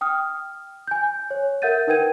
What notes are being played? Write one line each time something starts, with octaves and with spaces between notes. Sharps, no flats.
G5 D#6 F6
G#5 G6
C#5
A#4 E5 F#5 G6 A6 D#7
D#4 A#4 B4 G5 G#6 D#7